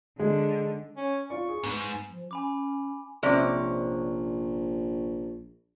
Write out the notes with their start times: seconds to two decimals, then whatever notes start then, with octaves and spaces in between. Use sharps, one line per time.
0.20 D3 G#3
0.97 C#4
1.30 F4 D5 C#6
1.49 G#4
1.64 G#2 B3 B4
2.09 F3
2.31 C#4 G#5 B5 D6
3.23 A#1 C3 C#4 D5